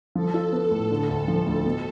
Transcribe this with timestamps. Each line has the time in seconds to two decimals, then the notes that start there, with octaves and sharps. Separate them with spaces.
0.15 F3 A4
0.34 F4
0.52 B3 A4
0.71 A2
0.90 D3
1.09 D2
1.28 F3 A4
1.46 D2
1.65 B2